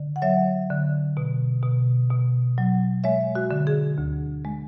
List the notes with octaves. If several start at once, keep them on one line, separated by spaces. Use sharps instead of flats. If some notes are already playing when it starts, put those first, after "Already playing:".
Already playing: D3
F#5
F#3 C#5 E5
D3
B2
B2
B2
F#3
G#3 C#5 E5
F#4
D3
G#4
D2
G#3